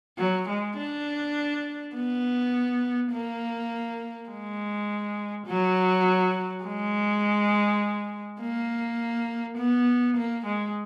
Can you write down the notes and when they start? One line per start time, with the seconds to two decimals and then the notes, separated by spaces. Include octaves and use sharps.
0.18 F#3
0.48 G#3
0.77 D4
1.95 B3
3.12 A#3
4.29 G#3
5.46 F#3
6.64 G#3
8.40 A#3
9.57 B3
10.17 A#3
10.45 G#3